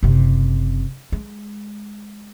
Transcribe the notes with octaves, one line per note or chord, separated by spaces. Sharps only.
F#1 C3
G#3